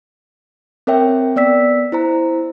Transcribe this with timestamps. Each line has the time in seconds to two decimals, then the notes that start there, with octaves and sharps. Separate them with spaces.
0.87 C4 A#4 C#5 E5 G5
1.36 B3 D5 E6 B6
1.92 E4 C5 A#5